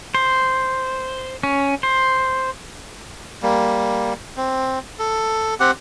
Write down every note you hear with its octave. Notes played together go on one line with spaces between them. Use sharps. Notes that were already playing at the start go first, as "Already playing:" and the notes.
C5
C#4
C5
G3 A#3
C4
A4
C4 G4 F#5